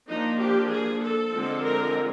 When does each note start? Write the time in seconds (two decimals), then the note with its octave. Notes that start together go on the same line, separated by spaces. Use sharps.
0.08 F3 A#3 D4 D#4
0.40 G4
0.70 G#4
1.02 A4
1.32 D3 F3 G#3 C4
1.63 A#4